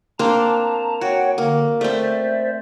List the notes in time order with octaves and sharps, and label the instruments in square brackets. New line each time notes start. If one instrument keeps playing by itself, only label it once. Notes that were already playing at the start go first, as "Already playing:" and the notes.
[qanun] A#3 C4 D4 [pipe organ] A5 A#5
[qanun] F#4 [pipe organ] C#5 F#5 G5
[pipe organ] D3 [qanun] A#3
[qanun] A3 C4 [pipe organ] C5 D5 E5